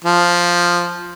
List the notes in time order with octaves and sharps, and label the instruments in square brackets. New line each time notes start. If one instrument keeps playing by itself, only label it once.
[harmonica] F3